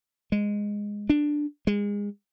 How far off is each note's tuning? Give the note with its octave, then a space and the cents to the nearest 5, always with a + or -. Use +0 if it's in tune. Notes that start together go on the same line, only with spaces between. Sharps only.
G#3 -10
D4 +5
G#3 -25